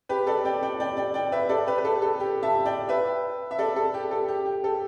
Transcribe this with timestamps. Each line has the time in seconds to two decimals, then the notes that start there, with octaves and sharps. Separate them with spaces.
0.09 G4 B4
0.27 A4 D5
0.45 D5 G5
0.63 D5 G5
0.80 D5 G5
0.97 D5 G5
1.14 D5 G5
1.32 B4 E5
1.49 A4 D5
1.67 G4 B4
1.78 B4
1.85 A4
2.02 A4
2.20 G4
2.43 E5 A5
2.65 D5 G5
2.89 B4 E5
3.51 E5
3.58 A4 D5
3.76 A4
3.94 G4
4.11 A4
4.29 G4
4.46 G4
4.64 A4